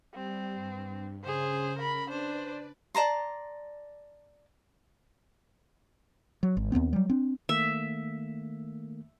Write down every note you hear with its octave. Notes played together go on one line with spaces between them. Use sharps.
G3 C4
G2
C#3 G#4 C5
A#4 B5
D4 B4 C5 D5
D5 A5 A#5 C6
F#3
G#1
D#2 G#2 B3 C4
F#3 G3
C4 D4
D#3 A3 A#3 E5